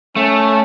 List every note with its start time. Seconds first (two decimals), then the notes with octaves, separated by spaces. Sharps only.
0.16 A3 C#4